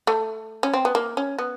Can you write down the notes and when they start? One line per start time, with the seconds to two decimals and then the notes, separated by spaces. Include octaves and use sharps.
0.07 A3
0.63 C#4
0.73 C4
0.85 B3
0.95 A#3
1.17 C#4
1.39 B3